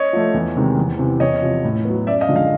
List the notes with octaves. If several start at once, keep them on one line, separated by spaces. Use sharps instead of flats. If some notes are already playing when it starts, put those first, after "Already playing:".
Already playing: C#5 D#5
F3 A3
E2
C3 D#3 G#3 C4
E2
C3 E3
E2 C#5 D#5
C3 F3
A2
F#3 B3
F#2 D5 E5
D#5 F5
D3 F3 G#3
D#5 F5